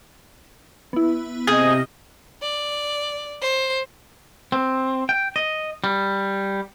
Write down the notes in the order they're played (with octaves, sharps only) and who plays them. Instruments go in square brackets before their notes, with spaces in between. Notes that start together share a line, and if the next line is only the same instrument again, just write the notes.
[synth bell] B3 E4
[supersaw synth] C3 D#5 [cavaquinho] G#4 [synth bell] F6 G6
[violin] D5
C5
[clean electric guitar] C4
G5
D#5
G3